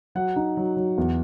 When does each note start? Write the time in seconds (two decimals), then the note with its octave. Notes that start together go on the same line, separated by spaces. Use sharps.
0.15 F#3 F#5
0.36 D#4
0.57 F#3
0.77 F#3
0.98 E2